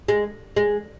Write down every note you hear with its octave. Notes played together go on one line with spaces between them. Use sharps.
G#3
G#3